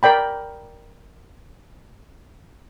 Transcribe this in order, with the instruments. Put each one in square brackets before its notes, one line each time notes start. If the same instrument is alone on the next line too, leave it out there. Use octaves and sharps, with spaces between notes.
[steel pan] A#4 D5 G5 B5